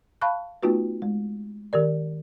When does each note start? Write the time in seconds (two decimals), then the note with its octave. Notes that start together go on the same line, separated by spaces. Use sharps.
0.22 F5 A5 B5 C#6 F#6
0.63 A3 B3 D#4 F4 F#4 B4
1.02 G#3
1.73 D#3 G4 A#4 D5